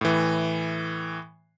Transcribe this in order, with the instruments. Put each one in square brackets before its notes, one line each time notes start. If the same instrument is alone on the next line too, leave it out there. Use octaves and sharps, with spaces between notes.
[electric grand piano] A2 E3